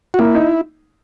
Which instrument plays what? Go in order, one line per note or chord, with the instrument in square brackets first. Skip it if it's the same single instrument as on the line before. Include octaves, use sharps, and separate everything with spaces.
[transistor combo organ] F#4
[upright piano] A#3 [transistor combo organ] E4
[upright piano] D#4